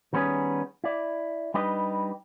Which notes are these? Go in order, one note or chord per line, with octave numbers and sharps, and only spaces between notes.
D#3 G3 B3 C#4 G#4
E4 D5
G3 D4 D#4 G4 B4 D#5